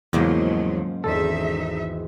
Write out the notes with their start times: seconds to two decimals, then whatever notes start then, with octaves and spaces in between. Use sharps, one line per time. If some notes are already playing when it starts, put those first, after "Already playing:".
0.13 E2 G#2 C#3 F3 F#3 A#3
1.04 G#1 E2 D#4 A4 E5